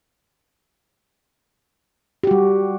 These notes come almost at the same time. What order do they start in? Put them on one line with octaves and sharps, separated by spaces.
G4 F#4 G3